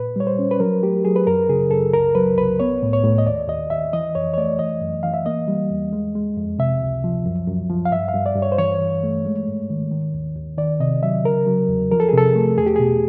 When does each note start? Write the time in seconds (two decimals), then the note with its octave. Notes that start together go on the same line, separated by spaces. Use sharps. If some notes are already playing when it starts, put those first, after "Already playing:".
Already playing: A#2 B4
0.16 G3 C#5
0.27 C5
0.39 C#4
0.51 B4
0.60 F#3 A#4
0.83 A3 G4
1.05 F#3 G#4
1.16 B4
1.27 F#2 A#4
1.49 C#3 G#4
1.71 F#2 A4
1.93 C2 A#4
2.15 F#3 B4
2.37 C2 B4
2.60 B3 C#5
2.83 A2
2.93 C#5
3.04 A2
3.18 D#5
3.26 D#2 D5
3.48 D#2 D#5
3.70 D#2 E5
3.93 E3 D#5
4.15 F2 C#5
4.34 C#5
4.38 A3 D5
4.59 E3 D#5
4.81 F#2
5.03 E3 F5
5.14 E5
5.26 A#3 D#5
5.48 G3
5.70 E2
5.93 G#3
6.15 G#3
6.37 F2
6.59 C3 E5
6.82 C#2
7.04 F3
7.26 F#2
7.47 F#2
7.70 F3
7.85 F5
7.92 G2 E5
8.08 F5
8.14 G2
8.26 D5
8.36 G2
8.42 C#5
8.52 C5
8.58 E3 C#5
8.81 E3
9.03 A3
9.25 G#3
9.48 G#2
9.70 D#3
9.91 D#3
10.14 D#2
10.36 D#2
10.58 D#3 D5
10.80 C3 D#5
11.03 F#3 E5
11.25 C#3 A#4
11.47 F#3
11.69 E2
11.92 F3 A#4
12.00 A4
12.09 G#4
12.13 C3 A4
12.36 A3
12.58 E2 G#4
12.66 G4
12.76 B2 G#4